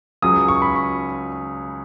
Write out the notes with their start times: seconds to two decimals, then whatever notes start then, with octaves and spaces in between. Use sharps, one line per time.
0.22 C#2 C#3 F#3 D#6
0.48 C#6
0.62 B5
0.76 C#6